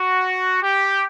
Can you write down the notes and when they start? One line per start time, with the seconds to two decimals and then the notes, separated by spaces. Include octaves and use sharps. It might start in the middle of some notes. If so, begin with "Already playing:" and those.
Already playing: F#4
0.61 G4